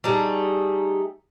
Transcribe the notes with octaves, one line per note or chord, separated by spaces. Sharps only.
G3 A3 D#4 G#4